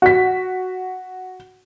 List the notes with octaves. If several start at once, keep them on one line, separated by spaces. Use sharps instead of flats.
F#4 B6